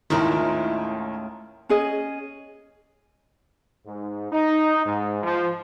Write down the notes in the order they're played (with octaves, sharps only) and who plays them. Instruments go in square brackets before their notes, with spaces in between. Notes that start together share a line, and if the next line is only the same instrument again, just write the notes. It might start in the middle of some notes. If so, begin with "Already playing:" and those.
[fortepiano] D#2 D#3 [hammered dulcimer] A2 F4 [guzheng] G#3 C#4 A#4 [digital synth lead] E4
[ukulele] C#4 G#4 D#5
[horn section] G#2
D#4
G#2
F3